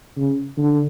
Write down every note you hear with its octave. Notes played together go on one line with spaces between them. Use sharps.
C#3
D3